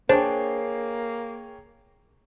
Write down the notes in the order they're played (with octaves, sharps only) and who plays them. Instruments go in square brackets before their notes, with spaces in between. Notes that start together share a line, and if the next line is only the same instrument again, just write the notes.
[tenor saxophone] A#3 [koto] D4 [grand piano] G#4 C#5 G5 [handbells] C5